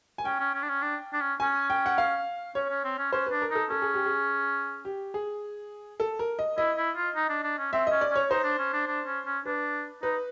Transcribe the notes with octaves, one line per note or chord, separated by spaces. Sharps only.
G#5
C#4 G5
C#4
C#4
D4
C#4
D4
D4
C#4
C#4 G#5
G5
F#5
F5
C#4 C#5
C#4
C4
C#4
C#4 C5
D4 B4
A#4
D#4 A4
C#4 A4
G#4
G4
G#4
G4
G#4
A4
A#4
D#5
E4 D#5
E4
F4
D#4
D4
D4
C#4
C4 E5
C#4 D#5
D5
C#4 C#5
D#4 C5
D4
C#4
D4
D4
C#4
C#4
D4 B4
D#4 B4